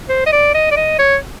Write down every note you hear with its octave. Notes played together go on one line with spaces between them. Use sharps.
C5
D#5
D5
D#5
D5
D#5
C#5